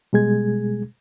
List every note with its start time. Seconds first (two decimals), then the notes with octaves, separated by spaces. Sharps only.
0.13 B2 G3 G#3 G#4 G#6